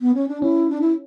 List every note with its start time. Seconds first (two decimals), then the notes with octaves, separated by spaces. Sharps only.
0.01 B3
0.14 C#4
0.28 D4
0.42 C#4 E4
0.70 D4
0.81 E4